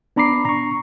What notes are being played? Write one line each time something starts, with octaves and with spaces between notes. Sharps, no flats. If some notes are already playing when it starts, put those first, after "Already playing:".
B3 D4 A#5 B5 D6 C7
A#5 C#6